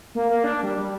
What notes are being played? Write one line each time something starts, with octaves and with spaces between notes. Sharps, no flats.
A#3
A#3
D4
G3
G3